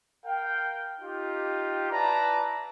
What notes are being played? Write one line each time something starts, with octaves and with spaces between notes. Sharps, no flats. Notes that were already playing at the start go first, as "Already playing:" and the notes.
A#4 F5 G5
D#4 F4 G4
E4 B4 D5 A5 A#5